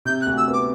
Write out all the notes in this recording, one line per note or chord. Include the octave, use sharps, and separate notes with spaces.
C3 G6
F#6
D2
E6
B3
D6